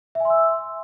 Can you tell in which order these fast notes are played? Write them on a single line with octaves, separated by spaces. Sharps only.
E5 G#5 C6 E6